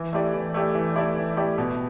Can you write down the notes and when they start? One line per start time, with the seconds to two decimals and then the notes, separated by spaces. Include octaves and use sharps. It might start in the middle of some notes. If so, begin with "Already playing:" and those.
Already playing: E3
0.13 A3 E4 G4 D5
0.34 E3
0.54 A3 E4 G4 D5
0.75 E3
0.96 A3 E4 G4 D5
1.16 E3
1.37 A3 E4 G4 D5
1.58 B2